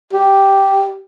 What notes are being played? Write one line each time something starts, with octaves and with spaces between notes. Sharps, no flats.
G4